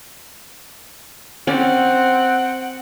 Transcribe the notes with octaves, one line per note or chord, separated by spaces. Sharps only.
C4 C#4 D5 F#5